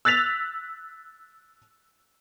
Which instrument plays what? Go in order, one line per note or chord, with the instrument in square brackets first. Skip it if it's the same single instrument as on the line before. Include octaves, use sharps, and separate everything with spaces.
[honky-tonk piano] E6 F#6 A6 B6 F7